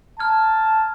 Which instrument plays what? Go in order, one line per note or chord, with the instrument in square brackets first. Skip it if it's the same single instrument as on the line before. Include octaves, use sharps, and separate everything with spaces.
[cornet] A5 [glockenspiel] A#5 F6 G#6